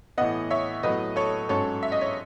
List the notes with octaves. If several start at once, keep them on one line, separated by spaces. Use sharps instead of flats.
A2 E3 B3 D#5 F#5
C#5 E5
A2 F#3 B3 B4 D#5
A4 C#5
G#2 F#3 C#4 A4 C#5
E5
D#5
C#5